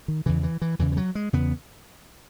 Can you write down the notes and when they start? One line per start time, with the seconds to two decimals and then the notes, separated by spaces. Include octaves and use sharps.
0.08 D#3
0.26 E2 C#3 E3
0.43 E3
0.62 E3
0.79 E2 C#3 E3
0.92 E3
0.97 F#3
1.15 G#3
1.33 E2 C#3 B3